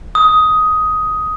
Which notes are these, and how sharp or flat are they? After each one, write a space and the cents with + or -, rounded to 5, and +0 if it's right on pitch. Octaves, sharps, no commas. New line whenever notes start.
D#6 +10